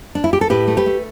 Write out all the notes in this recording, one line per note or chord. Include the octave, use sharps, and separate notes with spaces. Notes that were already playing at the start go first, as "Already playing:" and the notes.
D4
E4
G4
A4
A2 G4 B4
A3
G4 B4
A3